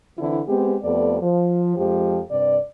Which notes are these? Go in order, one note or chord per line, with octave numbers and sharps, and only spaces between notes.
D3 E3 C4 D4 E4
G#3 B3 C4 G4
F2 A3 B3 G4 D5
F3
F2 F3 G#3 G4
G2 C3 D5